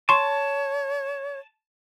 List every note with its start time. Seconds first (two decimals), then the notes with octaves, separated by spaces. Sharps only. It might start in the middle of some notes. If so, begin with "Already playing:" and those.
0.09 C#5 A5 C6 C#6